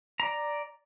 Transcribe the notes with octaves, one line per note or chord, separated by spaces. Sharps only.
D5 A#5